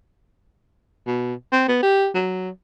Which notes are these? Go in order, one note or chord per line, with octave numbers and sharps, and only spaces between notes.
B2
C4
B3
G4
F#3